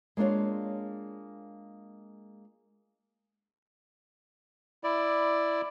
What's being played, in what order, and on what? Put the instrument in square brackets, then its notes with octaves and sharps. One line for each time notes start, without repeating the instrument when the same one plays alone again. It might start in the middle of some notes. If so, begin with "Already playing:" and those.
[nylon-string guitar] G#3 A#3 D4 F4 C#5
[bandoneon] E4 D5